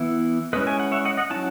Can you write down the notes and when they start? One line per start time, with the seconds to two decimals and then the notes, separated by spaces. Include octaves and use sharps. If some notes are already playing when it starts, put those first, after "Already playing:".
Already playing: E3 B3 E4
0.53 G#3 C#4 E4 B4 D#5
0.67 G#5
0.80 F#5
0.92 C#5 E5
1.05 D#5 F#5
1.17 D#5 F#5
1.30 F#3 C#4 E4 F#5 A5